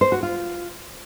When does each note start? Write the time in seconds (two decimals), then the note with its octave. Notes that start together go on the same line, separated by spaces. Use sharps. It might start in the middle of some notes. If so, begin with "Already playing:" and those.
0.01 C5
0.12 F#4
0.23 F4